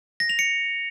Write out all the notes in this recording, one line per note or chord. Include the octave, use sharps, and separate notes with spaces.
A#6
F7
C#7